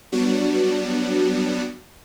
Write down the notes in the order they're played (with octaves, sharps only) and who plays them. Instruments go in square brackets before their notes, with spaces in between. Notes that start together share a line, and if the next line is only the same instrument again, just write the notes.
[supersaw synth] F#3 G3 B3 D4 F#4